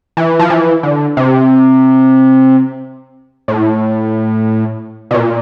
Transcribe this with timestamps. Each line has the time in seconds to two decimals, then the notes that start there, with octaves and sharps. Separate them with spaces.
0.17 E3
0.39 F3
0.50 E3
0.83 D3
1.17 C3
3.48 A2
5.11 B2
5.14 A#2